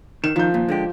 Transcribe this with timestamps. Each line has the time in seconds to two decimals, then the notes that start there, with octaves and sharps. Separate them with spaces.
0.24 D#3 E7
0.36 D#3 F3 G6
0.54 D#2 A#2
0.68 D3 G#3 G4